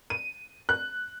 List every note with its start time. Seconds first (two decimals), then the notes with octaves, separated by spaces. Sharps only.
0.10 D#7
0.69 F#6